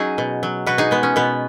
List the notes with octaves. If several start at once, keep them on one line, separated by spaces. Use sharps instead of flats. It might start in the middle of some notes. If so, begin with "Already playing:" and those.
Already playing: F#3 C#4 D#4 F#4 G#4
B2
F#3
B2 F#4 B4
D#4 G#4
G#3 B3
C#4
B2 B3